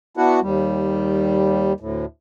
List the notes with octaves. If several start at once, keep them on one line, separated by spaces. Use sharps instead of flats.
B3 D4 E4 F#4 F#5
D#2 G3
D2 A2